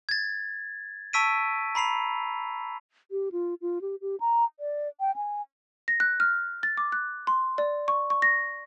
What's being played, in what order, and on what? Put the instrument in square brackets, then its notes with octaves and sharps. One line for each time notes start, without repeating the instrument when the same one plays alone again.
[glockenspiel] G#6 A6
A5 C#6 E6 B6 D7 D#7
A#5 B5 C7 F7
[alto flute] G4
F4
F4
G4
G4
A#5
D5
G5
G#5
[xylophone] A#6
F#6
F6
A6
D6
F#6
C6
D5
C#6
C#6
A#6